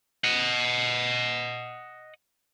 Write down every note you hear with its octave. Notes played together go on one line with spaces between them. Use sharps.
D#5 F#5